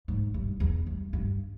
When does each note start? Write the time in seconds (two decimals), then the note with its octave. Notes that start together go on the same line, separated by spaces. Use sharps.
0.08 G#2
0.34 G2
0.60 E2
0.87 G2
1.13 G2